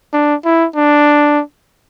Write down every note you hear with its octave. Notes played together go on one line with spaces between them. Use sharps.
D4
E4
D4